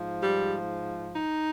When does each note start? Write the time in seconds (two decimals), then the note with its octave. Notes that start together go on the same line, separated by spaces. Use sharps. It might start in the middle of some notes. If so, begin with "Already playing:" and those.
Already playing: G#2 F3
0.20 G3
1.14 D#4